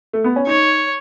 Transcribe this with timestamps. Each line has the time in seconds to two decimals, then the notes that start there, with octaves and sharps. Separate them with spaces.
0.13 A3
0.24 B3
0.36 C#4
0.47 D#4 C#5